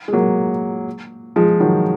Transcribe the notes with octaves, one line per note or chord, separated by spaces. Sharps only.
G#3
F#3 A#3
F3 G#3
D#3 F#3